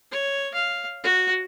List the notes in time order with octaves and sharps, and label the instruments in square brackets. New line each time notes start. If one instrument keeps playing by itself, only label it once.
[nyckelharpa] C#5
F5
F#4